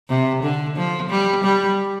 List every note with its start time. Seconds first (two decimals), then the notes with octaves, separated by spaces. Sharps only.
0.09 C3
0.43 D3
0.76 F3
1.10 G3
1.44 G3